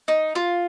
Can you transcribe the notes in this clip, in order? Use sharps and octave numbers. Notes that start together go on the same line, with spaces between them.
D#4
F4